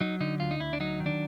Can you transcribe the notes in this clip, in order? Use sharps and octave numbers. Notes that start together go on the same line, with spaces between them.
F#3 D#4
D3 D#4
D2 F4
D#4
D2 E4
D4
F#3 D#4
D#3
D4